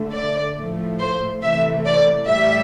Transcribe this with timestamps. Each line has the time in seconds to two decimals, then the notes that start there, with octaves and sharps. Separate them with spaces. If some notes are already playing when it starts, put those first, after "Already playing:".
Already playing: D3 A3
0.13 D5
0.56 A2 F3 A3
1.00 C5
1.42 C3 E3 A3 E5
1.86 D5
2.28 A2 G3 E5